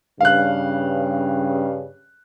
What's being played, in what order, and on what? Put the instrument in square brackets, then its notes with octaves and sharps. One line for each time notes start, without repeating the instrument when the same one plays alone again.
[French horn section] G2 C#3 [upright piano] F5 F#6